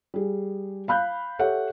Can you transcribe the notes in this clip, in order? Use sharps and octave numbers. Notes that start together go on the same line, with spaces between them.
G3 G#4
F5 B5 F#6 G6
G4 A4 C#5 E5 F#5